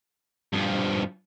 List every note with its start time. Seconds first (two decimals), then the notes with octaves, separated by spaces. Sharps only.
0.53 G2 F3